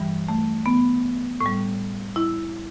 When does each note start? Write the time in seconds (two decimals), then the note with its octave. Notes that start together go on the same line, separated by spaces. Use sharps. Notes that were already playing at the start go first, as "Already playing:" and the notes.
Already playing: G2 E3 G3
0.29 A3
0.66 B3
1.41 A2
1.46 G3
2.16 E4